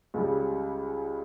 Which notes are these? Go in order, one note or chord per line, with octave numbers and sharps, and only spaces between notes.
C#2 C#3 G3